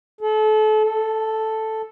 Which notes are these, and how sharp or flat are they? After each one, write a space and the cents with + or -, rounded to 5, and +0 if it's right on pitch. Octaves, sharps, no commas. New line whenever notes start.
A4 -30
A4 +0